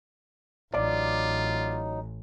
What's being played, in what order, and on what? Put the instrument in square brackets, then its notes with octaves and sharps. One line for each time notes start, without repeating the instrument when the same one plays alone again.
[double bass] A1 [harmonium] F#3 D#4 [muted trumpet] F4 [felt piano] D5 D6